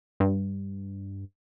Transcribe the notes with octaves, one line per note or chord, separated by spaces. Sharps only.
G2